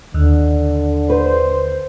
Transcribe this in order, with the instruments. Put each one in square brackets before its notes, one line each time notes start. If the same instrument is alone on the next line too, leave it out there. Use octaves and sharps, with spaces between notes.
[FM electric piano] D#2 [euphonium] D3
[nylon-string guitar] B4 [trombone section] C5